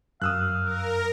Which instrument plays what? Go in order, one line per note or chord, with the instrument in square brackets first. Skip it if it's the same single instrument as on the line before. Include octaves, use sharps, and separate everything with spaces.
[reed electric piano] F#2 [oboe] F5 [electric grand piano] D#6 E6 F#6
[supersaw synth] A#4